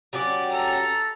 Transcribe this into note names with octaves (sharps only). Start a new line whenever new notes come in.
F#3 C#4 G4 D5
A4 A#5